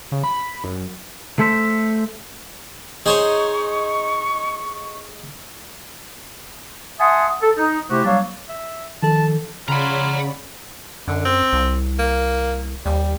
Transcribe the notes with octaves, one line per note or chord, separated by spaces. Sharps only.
C#3
B5
F#2
A3 A4 C5 E5
D#4 G#4 C5 C#5 C#6
E5 F#5 G#5 A5 C6 D#6
A4
D#4
C3 A3 E4 F#4 G4 C5
F#3 G3 A#3 D4 C#5 F5
E5
D#3 F3 A4 A5
C#3 F4 C#5 D5 F#5 A#5 B5
F#2 D3
C4
C2
A#3
D#2 G3